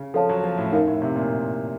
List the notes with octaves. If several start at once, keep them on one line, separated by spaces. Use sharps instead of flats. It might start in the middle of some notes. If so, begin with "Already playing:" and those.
Already playing: C#3
F3 A4 C#5 F5 A5
F#3
F3
A2
F#2 D#4 A#4 F5
A2
C3
A#2